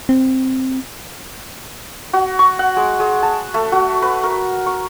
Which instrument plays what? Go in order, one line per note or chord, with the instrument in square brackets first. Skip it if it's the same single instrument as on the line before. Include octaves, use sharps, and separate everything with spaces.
[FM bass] C4
[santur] F#4
C#6
F#5
G#3
G#3
A5
A3
F#4
B4
A#4
C#6